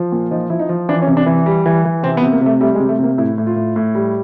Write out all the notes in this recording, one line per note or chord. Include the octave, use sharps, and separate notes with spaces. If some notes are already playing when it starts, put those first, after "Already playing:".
Already playing: F3
A#2
F3 D#4
F3 E4
D#4
F3
E3 D4
C#4
C3
D4
E3
G3
E3
E3
C3 C4
B3
C3
A#3
C3 A3
G3 A3
G#3
C3
A3
C3 A#3
A2 E4
A2
F4
A2
A2
G3